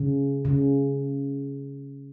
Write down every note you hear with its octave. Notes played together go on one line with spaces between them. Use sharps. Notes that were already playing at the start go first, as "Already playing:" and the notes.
Already playing: C#3
C#3